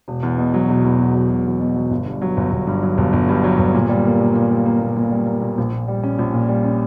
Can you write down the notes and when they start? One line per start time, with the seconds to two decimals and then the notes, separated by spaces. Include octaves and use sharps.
0.08 E1
0.23 E2
0.38 B2
0.54 F#3
0.69 E1
0.84 E2
0.99 B2
1.15 F#3
1.30 E1
1.46 E2
1.60 B2
1.76 F#3
1.91 G1
2.06 G2
2.22 F#3
2.37 G1
2.52 G1
2.67 G2
2.83 F#3
2.98 G1
3.13 G1
3.29 G2
3.44 F#3
3.59 G1
3.74 A#2
3.89 G3
4.05 A#3
4.20 A#2
4.35 A#2
4.51 G3
4.66 A#3
4.81 A#2
4.96 A#2
5.11 G3
5.26 A#3
5.42 A#2
5.58 A#1
5.73 A#2
5.88 G3
6.03 C#4
6.19 A#1
6.34 A#2
6.49 G3
6.64 C#4